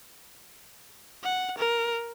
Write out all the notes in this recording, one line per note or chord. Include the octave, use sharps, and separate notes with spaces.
F#5
A#4